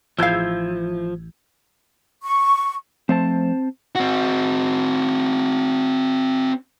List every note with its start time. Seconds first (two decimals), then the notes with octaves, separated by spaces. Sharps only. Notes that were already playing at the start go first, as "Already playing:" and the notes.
0.19 A1 F3 E4 F5 E6 G6 G#6
2.23 C#6
3.09 F3 A3 C4 C5 A5
3.95 C4 F#4